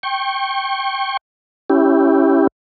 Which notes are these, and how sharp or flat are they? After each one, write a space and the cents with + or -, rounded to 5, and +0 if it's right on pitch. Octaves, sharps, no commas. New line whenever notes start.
G5 +0 C#6 -30
C#4 +0 E4 +0 G4 +0